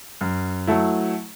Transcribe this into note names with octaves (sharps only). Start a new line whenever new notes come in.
F#2
F#3 A3 E4